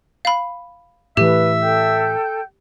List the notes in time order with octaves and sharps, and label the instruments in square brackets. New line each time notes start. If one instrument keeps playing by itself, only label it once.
[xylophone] F5 B5
[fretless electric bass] A2 E3 [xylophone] G4 [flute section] B4 [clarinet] E5
[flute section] A4 G5 G6